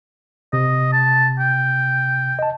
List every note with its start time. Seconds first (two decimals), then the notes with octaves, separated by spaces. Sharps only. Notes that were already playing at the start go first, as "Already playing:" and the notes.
0.53 C3 D#5
0.93 A5
1.40 G5
2.39 D#5 A5